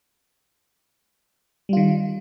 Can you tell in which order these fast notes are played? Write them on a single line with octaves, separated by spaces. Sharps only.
G3 F4 D#3